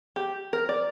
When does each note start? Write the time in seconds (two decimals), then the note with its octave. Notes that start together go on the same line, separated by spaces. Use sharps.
0.16 G4
0.53 A#4
0.69 D5